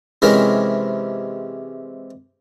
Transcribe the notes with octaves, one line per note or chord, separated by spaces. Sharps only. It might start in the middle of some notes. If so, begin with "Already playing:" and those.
C3 E3 G#3 C#4 E4 A#4